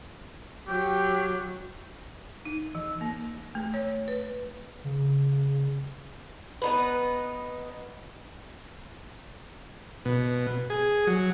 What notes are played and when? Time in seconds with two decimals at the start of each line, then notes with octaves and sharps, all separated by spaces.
0.67 F#3 G4
2.45 D#4
2.75 E3
3.01 A#3
3.55 A3
3.74 C#5
4.08 B4
4.84 C#3
6.62 B3 D#4 B4
10.05 B2
10.70 G#4
11.07 F#3